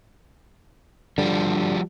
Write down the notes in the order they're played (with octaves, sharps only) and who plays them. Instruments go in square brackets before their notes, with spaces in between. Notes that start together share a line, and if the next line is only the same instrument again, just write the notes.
[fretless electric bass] G2 D3 [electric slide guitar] F3 G3